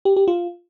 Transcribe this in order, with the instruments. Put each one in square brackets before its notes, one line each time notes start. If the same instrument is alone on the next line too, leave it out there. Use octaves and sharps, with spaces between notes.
[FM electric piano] G4
G4
F4